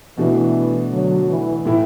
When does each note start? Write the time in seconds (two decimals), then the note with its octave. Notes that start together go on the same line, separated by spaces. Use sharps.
0.17 B2 E3 A3 D4 F#4
0.92 D3 F#3
1.29 E3
1.65 A2 E3 A3 E4